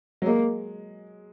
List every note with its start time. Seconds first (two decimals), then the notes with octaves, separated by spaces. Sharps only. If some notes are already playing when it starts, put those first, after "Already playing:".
0.22 F#3
0.26 G#3 A#3